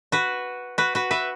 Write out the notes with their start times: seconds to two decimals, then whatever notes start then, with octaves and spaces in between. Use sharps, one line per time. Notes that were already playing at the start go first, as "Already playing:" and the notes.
0.12 F#4 B4
0.78 F#4 B4
0.95 F#4 B4
1.11 B4 E5